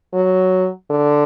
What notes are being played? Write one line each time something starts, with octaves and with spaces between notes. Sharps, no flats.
F#3
D3